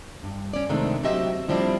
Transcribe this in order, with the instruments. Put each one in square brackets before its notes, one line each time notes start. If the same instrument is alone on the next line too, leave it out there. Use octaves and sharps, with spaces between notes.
[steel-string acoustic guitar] G2
C#4 D5
C3 D#3 G#3 A3 C4 D4
F#3 C4 F#4 G4 D#5 E5
C4
A2 F3 G3 C4 D4 E4